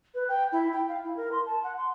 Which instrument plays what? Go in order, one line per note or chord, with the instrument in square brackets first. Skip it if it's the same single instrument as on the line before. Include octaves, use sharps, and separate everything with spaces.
[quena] B4
G5
E4
G5
F5
E4
A#4
C6
A5
F#5
C6